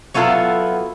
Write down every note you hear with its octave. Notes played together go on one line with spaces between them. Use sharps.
F#3 B3 E4 F4 A4